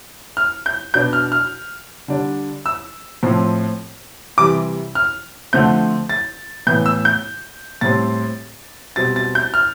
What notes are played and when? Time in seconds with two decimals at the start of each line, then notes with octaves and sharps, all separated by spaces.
0.37 F6
0.66 G6
0.94 B2 B3 D4 G6
1.13 F6
1.32 F6
2.08 D3 G3 D4
2.66 E6
3.23 A2 F3 C4
4.37 C3 E3 G3 D6
4.95 F6
5.53 D3 F3 A3 C4 G6
6.09 A6
6.67 A2 E3 B3 G6
6.86 E6
7.05 G6
7.81 A2 G3 C4 A6
8.96 B2 G3 C4 A6
9.16 A6
9.35 G6
9.54 F6